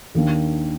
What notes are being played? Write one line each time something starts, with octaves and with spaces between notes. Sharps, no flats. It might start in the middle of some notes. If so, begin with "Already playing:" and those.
D#2 D#3 A#3 D4